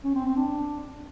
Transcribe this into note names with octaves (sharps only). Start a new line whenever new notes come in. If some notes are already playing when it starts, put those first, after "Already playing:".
C#4
C4
C4
D4